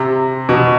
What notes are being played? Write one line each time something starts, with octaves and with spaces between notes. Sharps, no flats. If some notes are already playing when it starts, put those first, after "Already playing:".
Already playing: C3
B2